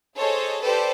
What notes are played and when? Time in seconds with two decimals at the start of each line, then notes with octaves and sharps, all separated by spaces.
0.17 G#4 A4 C5 C#5 D#5
0.61 G4 A4 B4 C5 D5